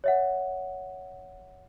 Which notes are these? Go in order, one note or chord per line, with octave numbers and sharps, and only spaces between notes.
C#5 E5 F#5